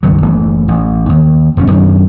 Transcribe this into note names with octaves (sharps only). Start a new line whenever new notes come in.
C#2 G2 D#3 F#3
F#1 E3 A3
A1
D#2
E1 F#2 C#4
F#2 D#3 C#4 D4